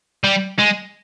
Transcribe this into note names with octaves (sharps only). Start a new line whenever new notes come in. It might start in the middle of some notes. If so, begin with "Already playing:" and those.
G3
G#3